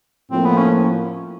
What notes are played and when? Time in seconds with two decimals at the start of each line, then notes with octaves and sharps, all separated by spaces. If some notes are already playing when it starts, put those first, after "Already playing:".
0.31 A2 F3 A#3 C4
0.45 B3
0.58 C#4